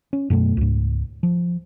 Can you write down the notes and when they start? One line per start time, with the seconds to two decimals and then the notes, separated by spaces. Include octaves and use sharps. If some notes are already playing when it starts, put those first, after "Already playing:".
0.13 C#4
0.30 F#2 B2 A3
0.57 C#2 G#2
1.23 F3